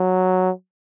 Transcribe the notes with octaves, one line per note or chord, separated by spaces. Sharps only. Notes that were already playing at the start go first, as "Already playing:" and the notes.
Already playing: F#3